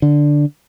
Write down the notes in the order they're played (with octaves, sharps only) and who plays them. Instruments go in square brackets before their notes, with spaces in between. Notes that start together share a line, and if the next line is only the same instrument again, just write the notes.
[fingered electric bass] D3